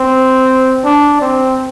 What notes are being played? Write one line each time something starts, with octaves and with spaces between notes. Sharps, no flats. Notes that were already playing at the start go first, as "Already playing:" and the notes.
Already playing: C4
D4
C4